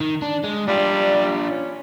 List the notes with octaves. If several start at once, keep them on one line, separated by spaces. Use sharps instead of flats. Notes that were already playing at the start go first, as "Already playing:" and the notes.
D#3
D4
G#3
G3 D4 F4
C#4